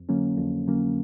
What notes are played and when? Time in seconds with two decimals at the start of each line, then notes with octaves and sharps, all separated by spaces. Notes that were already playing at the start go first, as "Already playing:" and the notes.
Already playing: F2
0.09 D3 F#3 A#3 C#4
0.38 F2
0.67 D3 F#3 A#3 C#4